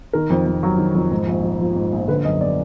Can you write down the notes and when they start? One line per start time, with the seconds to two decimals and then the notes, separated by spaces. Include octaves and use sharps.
0.13 D#3 A#4
0.30 F2
0.46 F2
0.63 F#3
0.78 D#3
0.95 F2
1.11 G#2
1.27 A#1
1.44 A#1
1.60 F3
1.76 G#2
1.93 A#1
2.08 D3 B4
2.24 F#2 D#5
2.41 B3 D5